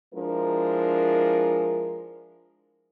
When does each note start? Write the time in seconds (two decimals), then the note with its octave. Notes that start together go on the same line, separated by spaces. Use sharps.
0.14 F3 G#3 D4 E4 A#4